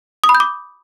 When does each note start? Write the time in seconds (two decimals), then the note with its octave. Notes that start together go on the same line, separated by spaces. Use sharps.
0.24 D#6
0.29 B5
0.35 G6
0.40 D6